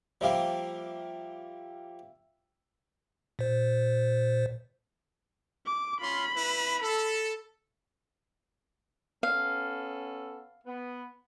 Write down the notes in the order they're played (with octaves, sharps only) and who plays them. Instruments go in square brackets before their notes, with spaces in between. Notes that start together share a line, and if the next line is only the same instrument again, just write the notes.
[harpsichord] F3 G3 A#3 [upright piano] E5 F5
[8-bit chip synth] A#2 C5
[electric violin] D6
[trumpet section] C#4 F4 C6 [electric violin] B5
[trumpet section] E4 B4
A4
[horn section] B3 C#4 A4 [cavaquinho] F5
[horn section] B3